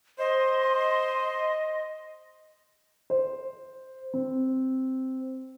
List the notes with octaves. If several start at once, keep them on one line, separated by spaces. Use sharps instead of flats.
C5 D#5 C6
C5
C4